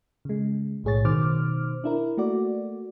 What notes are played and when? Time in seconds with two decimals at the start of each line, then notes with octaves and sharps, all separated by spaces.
0.25 C#3 G#3
0.84 B1 A2 G#4 C#5 A6
1.04 B2 D#3 C5 D6 F6
1.84 D4 E4 A#4
2.17 A3 A#3 F#4 D5